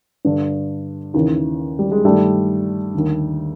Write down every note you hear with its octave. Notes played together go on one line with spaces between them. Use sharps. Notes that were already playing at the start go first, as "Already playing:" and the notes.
G2 D3
D#2 C#3 E3
G3
G#3
G2 D#3 G3 A3
D#2 D3